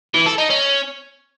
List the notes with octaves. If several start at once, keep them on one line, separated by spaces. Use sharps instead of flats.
E3
A4
D#4
C#4